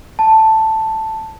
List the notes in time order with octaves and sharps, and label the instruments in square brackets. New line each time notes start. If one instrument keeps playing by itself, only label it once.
[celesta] A5